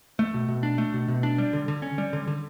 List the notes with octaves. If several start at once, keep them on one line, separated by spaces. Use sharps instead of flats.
A3
B2
B2
D4
A3
B2
B2
D4
G3
D3
D3
C#4
G3
D3
D3